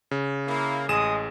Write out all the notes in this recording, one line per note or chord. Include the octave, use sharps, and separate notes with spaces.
C#3
A#3 E4
A1 G#3 G#4 D#6 E7